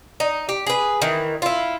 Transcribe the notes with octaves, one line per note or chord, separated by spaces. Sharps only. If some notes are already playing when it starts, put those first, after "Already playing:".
D#4
G4
G#4 B4
D#3 E3
E4 F4